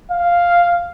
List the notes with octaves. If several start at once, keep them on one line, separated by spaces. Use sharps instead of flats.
F5